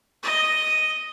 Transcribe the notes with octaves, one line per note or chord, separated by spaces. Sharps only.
D#5